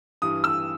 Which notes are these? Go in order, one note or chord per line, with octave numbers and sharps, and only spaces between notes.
G2 E3 D#6
E6